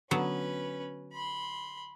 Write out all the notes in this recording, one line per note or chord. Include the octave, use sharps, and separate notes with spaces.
D3 F#3 B3 C#4 B4
B5 C6